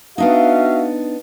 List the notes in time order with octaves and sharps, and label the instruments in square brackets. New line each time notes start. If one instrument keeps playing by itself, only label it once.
[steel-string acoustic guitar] B3 D4 D#4 [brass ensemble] F#4 E5 F5